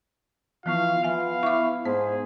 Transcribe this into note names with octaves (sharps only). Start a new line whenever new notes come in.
E3 F3 B3 F4 F5 C#6
B3 E5 F5 G#5
E4 C#6 D6
G#2 B3 G#4 C5